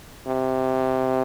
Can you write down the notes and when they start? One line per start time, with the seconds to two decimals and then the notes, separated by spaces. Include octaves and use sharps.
0.27 C3